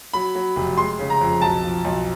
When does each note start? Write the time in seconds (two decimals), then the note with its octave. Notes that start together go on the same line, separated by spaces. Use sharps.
0.13 F#3 B5
0.35 F#3
0.56 F1
0.78 G#3 C6
0.99 C#3
1.10 A#5
1.21 F2
1.42 B1 A5
1.63 F3
1.84 B1